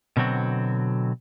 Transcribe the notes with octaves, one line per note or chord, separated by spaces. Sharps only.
B2 D3 F#3 C4 F#4